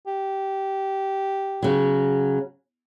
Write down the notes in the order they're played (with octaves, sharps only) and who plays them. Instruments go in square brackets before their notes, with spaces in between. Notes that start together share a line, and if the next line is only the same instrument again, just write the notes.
[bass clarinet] G4
[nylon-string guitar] C#3 F#3